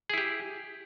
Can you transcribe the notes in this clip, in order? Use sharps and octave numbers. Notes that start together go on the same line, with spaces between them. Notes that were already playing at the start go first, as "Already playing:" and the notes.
E4 G4 G#4